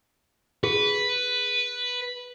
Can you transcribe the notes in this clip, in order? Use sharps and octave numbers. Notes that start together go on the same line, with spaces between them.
G#4 B4